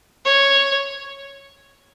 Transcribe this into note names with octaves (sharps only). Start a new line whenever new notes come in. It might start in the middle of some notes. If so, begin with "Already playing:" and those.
C#5